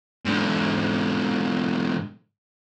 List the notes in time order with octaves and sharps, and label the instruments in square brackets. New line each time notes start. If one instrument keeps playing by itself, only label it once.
[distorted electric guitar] G#2 D3